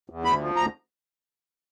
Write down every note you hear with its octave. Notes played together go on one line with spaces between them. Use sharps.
E2
D2 B5
F3
D2 A#5